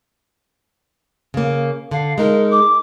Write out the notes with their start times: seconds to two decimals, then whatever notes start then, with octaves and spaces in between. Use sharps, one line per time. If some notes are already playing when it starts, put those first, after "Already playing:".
1.34 C#3 A#3
1.91 D3 F5
2.18 G#3 D#4 A#4
2.51 D6